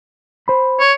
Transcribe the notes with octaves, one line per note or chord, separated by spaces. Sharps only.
C5 B5
C#5